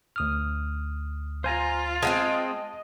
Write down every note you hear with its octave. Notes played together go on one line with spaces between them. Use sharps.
D2 D#6 F6
F4 C5 G#5 A#5
G#3 B3 C4 D#5 A5